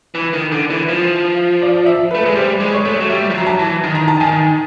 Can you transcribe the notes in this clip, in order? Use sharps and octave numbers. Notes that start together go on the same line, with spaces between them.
E3
D#3
D3
E3
F3
D5
E5
A3 B4
G#3
G3 C5
G#3
C#5
A3
F#3
G3 E5
F3
F#3 A#5
A5
E3
D#3
A#5
A5
D#3 G#5